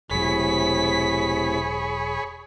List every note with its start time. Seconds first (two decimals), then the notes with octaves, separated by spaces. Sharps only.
0.11 E1 A2 C3 F#3 G#4 C#5 B5 B6